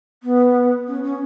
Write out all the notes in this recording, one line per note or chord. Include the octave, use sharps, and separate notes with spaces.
B3
C#4
C#4